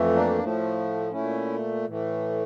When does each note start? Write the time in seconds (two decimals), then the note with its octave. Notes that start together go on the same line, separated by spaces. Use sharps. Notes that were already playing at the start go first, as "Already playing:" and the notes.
Already playing: F2 E3 A3
0.14 A#3 D4
0.39 A2 F3 A3
1.12 A#2 A3 C#4 E4
1.85 A2 E3 A3